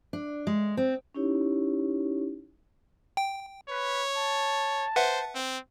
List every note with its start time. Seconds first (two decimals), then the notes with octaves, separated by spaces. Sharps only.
0.13 D4
0.47 G#3
0.77 C4
1.15 C#4 D#4 E4 G4 C#5
3.17 G5
3.70 B4 C#5
4.17 A5
4.96 B4 C5 E5 F#5
5.35 C4